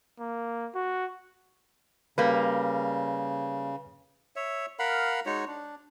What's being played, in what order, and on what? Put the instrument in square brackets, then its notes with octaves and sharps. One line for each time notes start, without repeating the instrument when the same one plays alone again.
[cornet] A#3
F#4
[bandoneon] C#3 [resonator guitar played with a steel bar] G3 A#3 [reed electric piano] B4 B5
[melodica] C#5 E5
A#4 F5 F#5 B5
G#3 D#4 F#4 C#5
D4